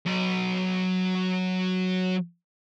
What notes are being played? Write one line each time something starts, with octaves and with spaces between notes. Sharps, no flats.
F#3 B5